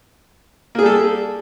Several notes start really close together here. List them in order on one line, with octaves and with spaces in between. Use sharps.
A#3 G#4 G3 A4